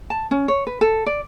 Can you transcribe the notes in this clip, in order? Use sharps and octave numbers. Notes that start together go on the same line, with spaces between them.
A5
C#4
C#5
B4
A4
D5